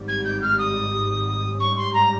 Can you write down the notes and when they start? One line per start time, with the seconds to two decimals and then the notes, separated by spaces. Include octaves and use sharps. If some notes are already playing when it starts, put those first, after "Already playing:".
Already playing: G#1 G#2 G3
0.08 G#6
0.25 G6
0.42 F6
0.59 D#6
1.60 G#2 G3 C#4 C#6
1.77 C6
1.94 A#5